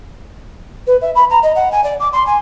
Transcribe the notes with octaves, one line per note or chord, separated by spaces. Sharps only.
B4
E5
B5
A#5
D#5
F#5
G#5
D5
D6
C6
G#5